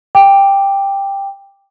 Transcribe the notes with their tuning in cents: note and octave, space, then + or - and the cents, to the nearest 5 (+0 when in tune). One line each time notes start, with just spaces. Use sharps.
G5 +10 D6 +0